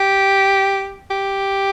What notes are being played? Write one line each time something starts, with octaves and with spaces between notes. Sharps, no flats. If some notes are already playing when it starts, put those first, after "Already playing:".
Already playing: G4
G4